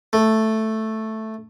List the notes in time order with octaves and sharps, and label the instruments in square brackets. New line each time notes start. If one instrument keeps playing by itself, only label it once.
[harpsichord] A3